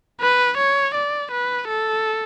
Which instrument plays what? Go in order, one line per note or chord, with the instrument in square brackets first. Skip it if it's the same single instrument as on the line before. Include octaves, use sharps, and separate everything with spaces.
[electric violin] B4
C#5
D5
B4
A4